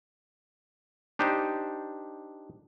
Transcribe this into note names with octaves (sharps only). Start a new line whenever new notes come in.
D4 D#4 G4 C5